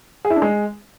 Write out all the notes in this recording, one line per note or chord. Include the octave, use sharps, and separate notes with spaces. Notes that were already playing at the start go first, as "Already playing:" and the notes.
G#4
E4
D4
G#3